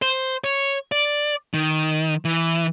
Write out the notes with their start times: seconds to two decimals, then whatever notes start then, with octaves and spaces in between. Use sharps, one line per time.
0.02 C5
0.44 C#5
0.92 D5
1.54 D#3
2.25 E3